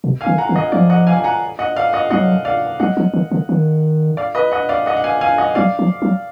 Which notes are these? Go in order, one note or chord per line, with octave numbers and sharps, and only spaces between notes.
B2
F5 G#5
D#3
F#5 A#5
D#3
D#5 F#5
F3 D5 F5
D#5 F#5
F5 G#5
G#5
F#5 A#5
D#5 F#5
D5 F5
D#5 F#5
F#3 D#5 F#5
D5 F5
F#3 D#5 F#5
F3
D#3
D3
D#3
D5 F5
B4 D#5
D#5 F#5
D5 F5
D#5 F#5
F#5
F5 G#5
F5 G#5
D#5 F#5
F#3 D5 F5
F3
F#3